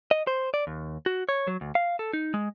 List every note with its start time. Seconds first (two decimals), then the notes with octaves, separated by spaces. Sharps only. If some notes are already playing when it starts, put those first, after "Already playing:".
0.11 D#5
0.27 C5
0.54 D5
0.67 D#2
1.06 F#4
1.29 C#5
1.47 F#3
1.61 D2
1.75 F5
1.99 A4
2.13 D#4
2.34 G#3